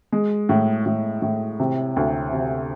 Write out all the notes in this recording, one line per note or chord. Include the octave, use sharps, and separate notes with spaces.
G#3
A2
A2
A2
C3
D2
C3